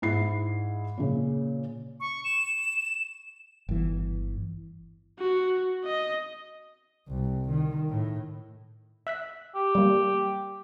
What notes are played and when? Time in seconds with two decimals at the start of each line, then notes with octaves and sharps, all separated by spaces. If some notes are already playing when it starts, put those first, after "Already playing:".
0.02 G#2 E4 C7
0.97 A#2 C#3
2.00 C#6
2.24 E7
3.69 G1 E3
5.19 F#4
5.85 D#5
7.08 C2
7.50 D#3
7.90 A2
9.07 E5 F#6 B6
9.55 G4
9.75 G3 A#3